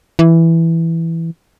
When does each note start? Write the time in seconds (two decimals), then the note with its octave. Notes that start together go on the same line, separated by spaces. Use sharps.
0.19 E3